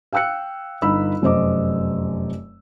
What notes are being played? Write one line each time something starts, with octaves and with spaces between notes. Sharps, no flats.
F5 G5 E6 F#6 C#7
G1 D#4 B5 E6
F1 F#2 C5 D#5 D6